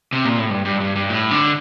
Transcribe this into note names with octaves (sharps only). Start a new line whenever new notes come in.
C3
A#2
A2
G2
G2
G2
G2
A2
D3